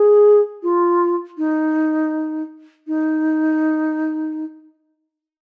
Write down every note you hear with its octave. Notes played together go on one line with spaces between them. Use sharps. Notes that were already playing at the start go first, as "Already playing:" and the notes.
Already playing: G#4
F4
D#4
D#4